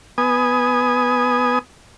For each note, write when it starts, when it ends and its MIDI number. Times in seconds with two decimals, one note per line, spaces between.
0.18 1.59 59
0.18 1.59 80
0.18 1.59 87